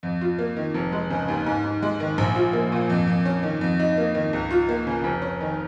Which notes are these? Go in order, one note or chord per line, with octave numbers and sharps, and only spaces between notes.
F2
F4
A#3
D#3
F1
G#3
C#3
D#2
G#2
G#2
G#3
D#3
A#1
F4
A#3
A#2
F2
F2
C#4
D#3
F2
D#4
A#3
D#3
C#2
F4
A#3
C#3
F1
C#4
D#3